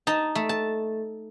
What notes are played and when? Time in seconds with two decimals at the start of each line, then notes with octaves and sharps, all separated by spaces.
0.07 D#4 A5
0.35 A3
0.49 A5